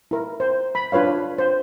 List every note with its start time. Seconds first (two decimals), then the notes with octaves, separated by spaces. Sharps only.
0.11 E4 A#4
0.40 C5
0.75 B5
0.92 D4 F4 B4 C#5 F5
1.38 C5